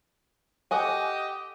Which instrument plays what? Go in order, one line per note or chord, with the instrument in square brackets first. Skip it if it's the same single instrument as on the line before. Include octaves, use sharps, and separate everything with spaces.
[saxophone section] F#4 G4 D#5 [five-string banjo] A4 F#5 G#5